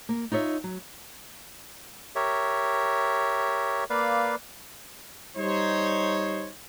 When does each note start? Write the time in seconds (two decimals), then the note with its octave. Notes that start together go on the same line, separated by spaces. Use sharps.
0.09 A#3
0.32 D#4 F4 C#5 E5
0.64 F#3
2.15 G4 A#4 C#5 E5
3.90 A#3 B4 D5 F5
5.37 G3 D#4 C5 C#5